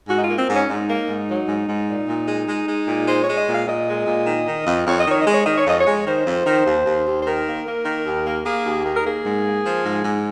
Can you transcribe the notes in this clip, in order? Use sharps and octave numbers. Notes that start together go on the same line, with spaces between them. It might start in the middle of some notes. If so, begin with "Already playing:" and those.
G#2 F#4
D#4
A#3 F4
C4
G#2 C#4
G#2 D#4
A#3
G#2
F#3
G#2
G#2
A#2
A#2
G#3
G#3
G#3
A#2
G#3 C5
C#5
G#3
D#5
A#2 F5
A#2 D#5
G#3
A#2
D#3
D#3
F2
F2 C#5
D#5
D#3 C#5
D#5
G#3
C#5
D#3 D#5
C#5
F2 D#5
C#5
G#3
D#3 C5
F2
D#3
D#2
D#2
D#2
C5
D#3 A#4
A#3
A#3
D#3
D#2
A#3
A#3 G#4
D#2
D#3
A#4
A#3 G#4
G#2
A#3
F3
G#2
G#2